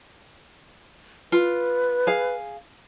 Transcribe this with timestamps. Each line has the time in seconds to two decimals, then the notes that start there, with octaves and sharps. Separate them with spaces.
1.32 F4 B4
2.07 G#4 F5